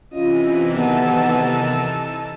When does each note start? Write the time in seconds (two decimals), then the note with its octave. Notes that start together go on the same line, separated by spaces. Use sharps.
0.13 C3 E3 C#4 F4 D#5
0.73 D#3 F#3 B3 D#4 A4